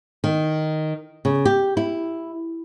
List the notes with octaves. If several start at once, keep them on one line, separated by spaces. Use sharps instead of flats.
D#3
C#3
G4
E4